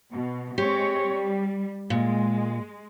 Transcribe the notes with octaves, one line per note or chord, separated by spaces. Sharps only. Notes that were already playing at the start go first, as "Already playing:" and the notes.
B2
G#3 C4 G4 C#5
G3
A#2 G#3